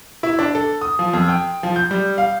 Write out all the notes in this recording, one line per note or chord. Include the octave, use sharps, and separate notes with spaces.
E4
D4
A4
D#6
F3
F2
G5
F3
G6
G3
F5